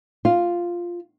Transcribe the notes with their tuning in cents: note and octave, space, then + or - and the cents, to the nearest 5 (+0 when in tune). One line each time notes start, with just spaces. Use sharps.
F4 +0 F5 +0